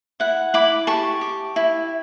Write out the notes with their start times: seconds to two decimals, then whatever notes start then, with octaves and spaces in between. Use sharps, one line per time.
0.20 E4 F#5
0.54 E4 B5 D6
0.87 G4 A5 C#6
1.21 G4
1.56 E4